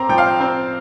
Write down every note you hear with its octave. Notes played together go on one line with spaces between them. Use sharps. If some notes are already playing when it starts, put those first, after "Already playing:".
Already playing: C4 A#5 C6 D6
F3 G5
F5
G5
C4